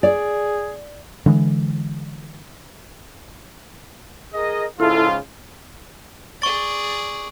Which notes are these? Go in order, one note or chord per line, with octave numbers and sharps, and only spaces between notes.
G#4 D5
D3 E3 G#3
G#4 A#4 D#5
G#2 C#3 E4 F4 A4
G#4 D5 C#6 A6